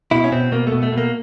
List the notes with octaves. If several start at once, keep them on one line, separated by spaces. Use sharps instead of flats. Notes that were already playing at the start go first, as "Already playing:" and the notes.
B2 E4
C#4
B2 C4
B2 A#3
B2 A3
A3
B2
A#3